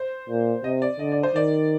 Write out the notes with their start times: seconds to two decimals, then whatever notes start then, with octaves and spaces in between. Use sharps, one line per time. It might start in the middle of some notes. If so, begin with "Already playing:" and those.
Already playing: C5
0.29 A#2
0.64 C3 D#5
0.82 D5
0.99 D3 D#5
1.12 D5
1.23 C5
1.35 D#3 D5